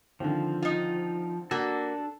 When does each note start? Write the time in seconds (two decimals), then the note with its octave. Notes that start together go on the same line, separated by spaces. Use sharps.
0.20 D3 D#3 F3 C4
0.62 D#4 F4
1.51 A#3 D4 F#4 A4